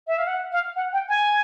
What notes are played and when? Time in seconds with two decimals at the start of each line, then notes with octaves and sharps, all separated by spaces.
0.07 E5
0.18 F5
0.27 F#5
0.52 F5
0.76 F#5
0.93 G5
1.09 G#5